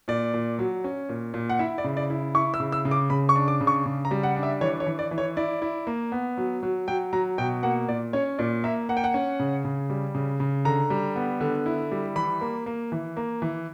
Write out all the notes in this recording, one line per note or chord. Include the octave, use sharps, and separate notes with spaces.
A#2 D5
A#2
F#3
C#4
A#2
A#2
F#5
E4 E5
D5
C#3
D5
E4
E4 C#6
E6
C#3
E6
C#3
D6
C#3 B5
C#6
D4
D6
C#3
C#6
C#3
A#5
G3
F#5
D4
E5
E3 C#5
C#5
E3
D5
E3
C#5
E4 D5
E4
A#3
B3
F#3
F#3
F#3 G5
F#3 A#5
B2 G5
A#3 F#5
A#2 D5
C#4 C#5
A#2 D5
A#3 E5
A#3 F#5
G5
F#5
C#4
C#3
C#3
G3
C#3
C#3
D3 A#5
G3
B3
D3
E4
G3
E3 B5
A#3
A#3
E3
A#3
E3